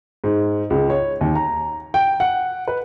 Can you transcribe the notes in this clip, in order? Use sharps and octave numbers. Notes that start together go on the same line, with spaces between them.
G#2
C#2
C#5
D#2
A#5
G5
F#5
B4